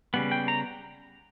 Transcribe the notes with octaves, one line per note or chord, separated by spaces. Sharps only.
C#3 G3 B3
G5
A#5